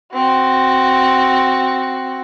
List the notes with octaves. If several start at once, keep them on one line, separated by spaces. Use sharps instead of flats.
C4 F#4